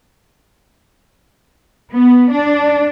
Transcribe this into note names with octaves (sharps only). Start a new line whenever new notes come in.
B3
D4